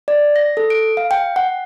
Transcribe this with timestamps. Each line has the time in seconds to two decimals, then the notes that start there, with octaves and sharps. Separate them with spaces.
0.08 D5
0.36 A#6
0.57 A4
0.70 D7
0.97 F5
1.11 G5
1.36 F#5